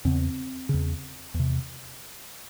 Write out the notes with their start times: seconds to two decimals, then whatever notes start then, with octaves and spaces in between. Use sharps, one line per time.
0.05 E2 C#3 C4
0.69 E2 C#3
1.34 E2
1.39 C3